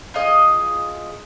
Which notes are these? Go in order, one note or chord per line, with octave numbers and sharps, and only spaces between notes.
F4 G#4 D#5